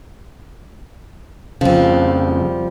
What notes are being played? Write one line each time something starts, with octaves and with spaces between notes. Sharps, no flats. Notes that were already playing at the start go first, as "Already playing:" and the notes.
F2 C#3 F3 G3